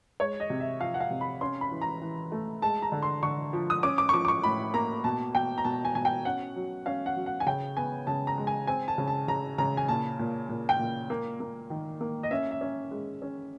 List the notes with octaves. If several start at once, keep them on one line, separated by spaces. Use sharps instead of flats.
G#3 C#5
D#5
C3
E5
F3 F5
F#5
F5
C3
B5
C#4 C6
B5
E3
A#5
E3
A3
G#3 A5
A#5
D3
C6
D3 C#6
F3
D#6
C#4 D6
D6
C#6
F3 D6
D6
C#6
A2 B5
A#3 A#5
B2 A5
B2 G5
A#5
B2 A5
G#5
B2 G#5
G5
C#4 F#5
F#3
C#4 F5
F#5
F#3
F#5
G#5
C#3 G5
B3 G#5
C#3 A5
A#5
G#3
G#5
C4 G#5
A5
C#3
A5
C#3 A#5
C#3 A#5
G#5
A#2 A5
A#2
A#2
G5
A#2
A#3
A#3
D#3
A#3
D#5
C#4 E5
E5
C#4
G#3
C#4